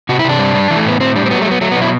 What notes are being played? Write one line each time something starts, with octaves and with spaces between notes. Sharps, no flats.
C3 F#4
E4
C3 D4
G3
G3
E3
A3
A2 B3
A2 C4
G3 D4
C4
F#3 B3
A3
F#3 B3
F#3 A3
B3
B2
E4